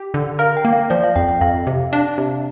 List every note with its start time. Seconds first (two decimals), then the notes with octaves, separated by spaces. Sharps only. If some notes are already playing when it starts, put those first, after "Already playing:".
Already playing: G4
0.14 D3
0.39 A#4 F5
0.57 G5
0.65 A#3
0.73 F5
0.90 F3 D5
1.04 F5
1.16 F2 G5
1.29 G5
1.41 F2 F5
1.67 C3
1.92 D4 F5
2.18 C3